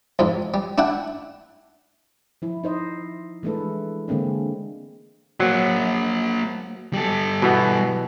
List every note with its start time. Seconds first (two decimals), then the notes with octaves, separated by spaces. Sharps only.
0.19 C2 F2 G#2
0.54 G3
0.78 D4 E4 F#5 G5
2.42 F3 E4
2.64 D#4 C5 D#5
3.43 E3 G#3 A3 D4 A4 B4
4.08 D3 G#3 A#3 C4 D4
5.40 F#3 A#3 C5
6.93 G3 A4
7.42 B2 E3 B3